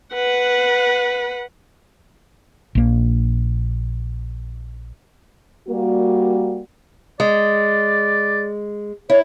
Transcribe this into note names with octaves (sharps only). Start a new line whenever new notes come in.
B4 F#5
A#1 A#3
G3 A#3 F#4
G#3 D5
E4 C#5